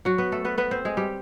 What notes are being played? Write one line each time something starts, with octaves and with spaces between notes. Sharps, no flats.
F#3 F#4
B3 B4
A3 A4
B3 B4
B3 B4
C4 C5
G#3 G#4
G3 G4